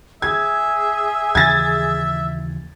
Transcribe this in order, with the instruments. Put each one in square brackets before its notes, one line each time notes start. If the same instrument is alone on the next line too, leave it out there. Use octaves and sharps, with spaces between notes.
[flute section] G#4 [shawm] E5 [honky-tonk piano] G#6
[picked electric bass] D#2 C#3 E3 [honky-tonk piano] G#6 A6